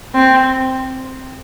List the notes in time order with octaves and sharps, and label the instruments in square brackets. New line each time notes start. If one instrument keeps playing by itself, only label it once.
[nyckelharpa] C4